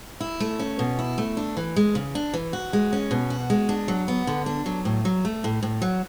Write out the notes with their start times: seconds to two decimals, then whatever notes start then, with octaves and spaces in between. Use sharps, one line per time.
0.20 E4
0.40 A3
0.59 C#4
0.79 B2
0.99 E4
1.18 A3
1.37 D4
1.57 E3
1.76 G#3
1.95 C#3
2.15 D4
2.33 E3
2.53 F#4
2.73 G#3
2.93 C#4
3.11 B2
3.30 F#4
3.50 G#3
3.69 D4
3.88 F#3
4.08 B3
4.27 D3
4.46 D4
4.66 F#3
4.85 A2
5.05 F#3
5.25 A3
5.44 A2
5.63 A2
5.82 F#3